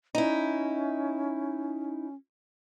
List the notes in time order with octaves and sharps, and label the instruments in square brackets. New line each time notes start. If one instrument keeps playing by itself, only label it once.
[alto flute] C#4 [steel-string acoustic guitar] D#4 E4